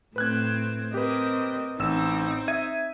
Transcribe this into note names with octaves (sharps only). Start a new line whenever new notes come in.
A2 C4 B4 F#6 G#6
C4 G4 A#4 B4 D#5
A1 C4 D#4 E6 E7
E5 G#6 D#7